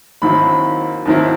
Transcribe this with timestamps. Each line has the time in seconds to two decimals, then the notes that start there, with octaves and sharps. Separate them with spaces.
0.22 D#2 D#3 F#3 C4 E4 B5
1.05 D#2 D#3 F#3 C4 E4